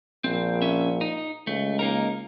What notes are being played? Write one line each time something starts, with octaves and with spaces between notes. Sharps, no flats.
A#1 C4
C#4 E5
D#4
C#2 A3
A#3 D#4 A#4